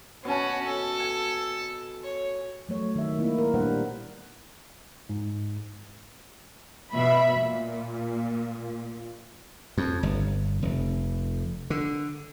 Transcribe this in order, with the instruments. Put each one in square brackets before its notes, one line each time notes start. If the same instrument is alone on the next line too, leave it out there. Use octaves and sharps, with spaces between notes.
[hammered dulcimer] B2 A5 [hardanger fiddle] C#4 F#4
[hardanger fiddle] A4
[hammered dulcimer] G#5
[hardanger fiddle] C#5
[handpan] F#3 A3 C#5
D#3 E5
A#3 B3 E4
A#4
A#2 G3 D4 B4 C5 F#5
[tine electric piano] G#2
[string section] B2 E5 B5
A#2
[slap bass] F2
G1
F1
D3